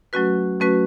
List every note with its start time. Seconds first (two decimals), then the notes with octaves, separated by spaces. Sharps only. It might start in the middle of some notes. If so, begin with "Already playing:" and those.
0.13 F#3 A3 C#4 F#4 B4
0.60 F#3 A3 C#4 F#4 B4